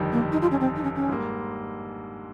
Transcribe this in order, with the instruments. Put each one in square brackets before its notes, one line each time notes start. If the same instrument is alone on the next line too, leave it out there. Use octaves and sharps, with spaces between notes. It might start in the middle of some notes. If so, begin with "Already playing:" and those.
Already playing: [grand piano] G1 F2 D#3 G3
[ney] A#3
D#4
F4
C#4
C4
D#4
C#4
C#4
[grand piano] G#2 G3 A#3